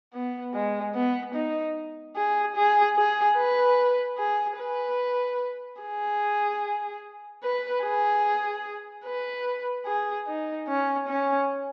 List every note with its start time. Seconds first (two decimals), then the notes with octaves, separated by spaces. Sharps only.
0.13 B3
0.54 G#3
0.94 B3
1.35 D#4
2.16 G#4
2.56 G#4
2.96 G#4
3.37 B4
4.18 G#4
4.58 B4
5.81 G#4
7.43 B4
7.83 G#4
9.06 B4
9.86 G#4
10.27 D#4
10.68 C#4
11.08 C#4